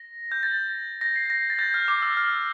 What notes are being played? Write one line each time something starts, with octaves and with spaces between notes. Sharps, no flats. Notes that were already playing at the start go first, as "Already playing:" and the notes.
Already playing: A#6
G6
A6
A#6
C7
A#6
A6
G6
F6
D6
E6
F6